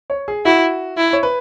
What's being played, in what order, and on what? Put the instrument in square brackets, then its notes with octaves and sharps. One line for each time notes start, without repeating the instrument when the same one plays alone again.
[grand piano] C#5
G#4
[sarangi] E4 [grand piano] F#4
[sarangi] E4
[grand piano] C#5
B4